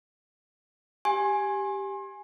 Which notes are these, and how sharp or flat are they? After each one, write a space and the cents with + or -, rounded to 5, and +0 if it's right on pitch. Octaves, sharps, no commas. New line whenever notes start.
G4 +0 G#5 +0 C6 +35